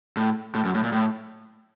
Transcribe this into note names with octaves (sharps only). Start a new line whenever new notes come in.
A2
A2
F#2
A2
A#2
A2